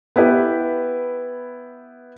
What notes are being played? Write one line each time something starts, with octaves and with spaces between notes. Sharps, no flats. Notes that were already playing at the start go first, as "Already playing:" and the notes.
B3 E4 G4 B4